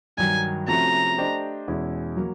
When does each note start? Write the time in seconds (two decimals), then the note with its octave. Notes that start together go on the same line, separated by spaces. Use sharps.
0.18 G2 D#3 F#3 G#5
0.67 C3 F3 A3 C#4 F#4 A#5
1.18 A3 D4 G4 C5 D#5
1.68 E2 B2 G#3 C#4 E4
2.17 F#3 A#3